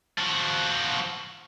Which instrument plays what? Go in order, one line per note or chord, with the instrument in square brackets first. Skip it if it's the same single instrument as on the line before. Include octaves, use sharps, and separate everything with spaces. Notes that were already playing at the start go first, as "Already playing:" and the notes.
[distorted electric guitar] F3 F#4